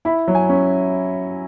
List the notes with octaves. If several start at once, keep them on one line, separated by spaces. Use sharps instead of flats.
E4 B5
F#3
G#5
C#4